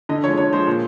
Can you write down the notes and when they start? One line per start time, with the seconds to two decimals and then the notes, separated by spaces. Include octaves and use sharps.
0.09 D3 D#5
0.24 F3 C#5
0.28 G#3
0.38 D3 C#5
0.53 F3 G#3 C5
0.67 A#2